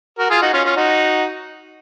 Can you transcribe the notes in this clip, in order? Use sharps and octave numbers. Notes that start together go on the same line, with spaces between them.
F#4 A#4
F4 G#4
D#4 F#4
C#4 F4
C#4 F4
D#4 F#4